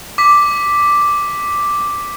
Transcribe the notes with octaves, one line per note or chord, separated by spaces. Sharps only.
D6 B6